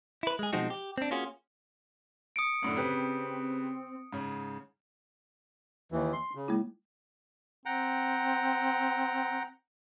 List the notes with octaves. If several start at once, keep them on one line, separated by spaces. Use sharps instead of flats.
E4 B4
G#3 G#4
B2 F3 G#3 C4 D#4 F#4
G4
C4 D4
A#3 C#4 F4 F#4 G#4
D#6 C#7 D7
F#2 A2 D3
C#3 C4 G4 B4
G#2 C#3
D#2 E3
C6
C#3
G#3 A#3 E4
C4 F#5 G5 A#5